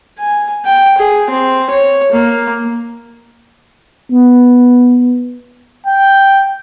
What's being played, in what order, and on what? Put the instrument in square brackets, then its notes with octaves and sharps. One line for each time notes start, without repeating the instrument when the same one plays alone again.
[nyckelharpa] G#5
G5
G#4
C4
C#5
A#3
[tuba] B3
[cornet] G5